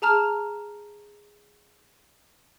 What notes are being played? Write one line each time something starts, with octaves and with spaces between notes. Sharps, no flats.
G#4 A5 A#5 F6